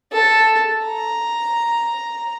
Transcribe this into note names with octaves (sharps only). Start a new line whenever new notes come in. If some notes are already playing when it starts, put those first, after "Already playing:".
A4
A#5